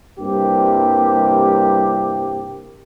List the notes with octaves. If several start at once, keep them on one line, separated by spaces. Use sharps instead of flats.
C2 G2 C3 A#3 G4